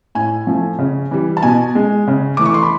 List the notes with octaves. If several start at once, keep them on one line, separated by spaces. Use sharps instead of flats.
A2 G#5
F3 A3
C#3
E3 G3
A5
B2 G#5
G#3
C#3
E3 A3 D6
C#6
C6
B5